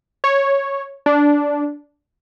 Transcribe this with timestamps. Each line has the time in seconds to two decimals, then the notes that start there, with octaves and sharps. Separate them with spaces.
0.24 C#5
1.06 D4